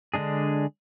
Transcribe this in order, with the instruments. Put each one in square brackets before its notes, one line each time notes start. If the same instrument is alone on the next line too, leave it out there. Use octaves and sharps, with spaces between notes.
[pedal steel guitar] D3 G#3 D4 G#4